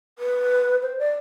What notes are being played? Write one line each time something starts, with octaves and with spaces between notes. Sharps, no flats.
B4
C5
D5